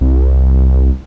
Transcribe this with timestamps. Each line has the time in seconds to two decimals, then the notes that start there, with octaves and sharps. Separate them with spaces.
0.01 C2